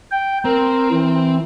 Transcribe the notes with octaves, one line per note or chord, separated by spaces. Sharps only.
G5
C4 A#4
E3